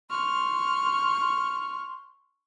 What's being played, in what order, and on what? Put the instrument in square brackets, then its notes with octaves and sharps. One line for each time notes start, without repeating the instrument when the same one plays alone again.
[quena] C6 [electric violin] C#6 F6